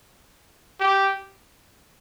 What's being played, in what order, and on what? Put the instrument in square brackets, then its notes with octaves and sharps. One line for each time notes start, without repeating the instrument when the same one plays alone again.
[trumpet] G4